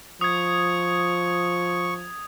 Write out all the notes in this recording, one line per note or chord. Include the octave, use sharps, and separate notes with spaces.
F3 C#6 D#6 G#6